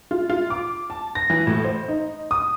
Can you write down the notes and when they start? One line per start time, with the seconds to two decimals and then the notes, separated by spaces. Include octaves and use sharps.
0.11 F4
0.30 F4
0.50 D6
0.90 A5
1.15 A#6
1.30 E3
1.47 A2
1.64 C5
1.88 D#4
2.31 D#6